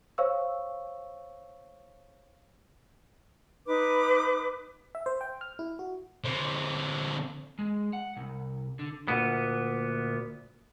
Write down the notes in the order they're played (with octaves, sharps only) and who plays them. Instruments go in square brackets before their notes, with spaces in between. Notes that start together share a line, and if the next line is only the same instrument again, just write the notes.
[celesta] C5 C#5 F5 C#6 E6
[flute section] D#4 B4 D6
[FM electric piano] E5
C5
G5
F6
E4
F#4
[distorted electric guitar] D3 C4
[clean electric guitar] G#3
F#5
C2
D3
D2 A#2 B3